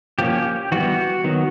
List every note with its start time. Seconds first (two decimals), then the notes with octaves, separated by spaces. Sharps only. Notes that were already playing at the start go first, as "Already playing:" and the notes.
0.19 F3 A#3 C#4 G4
0.72 E3 G3 B3 F#4
1.24 D#3 F#3 B3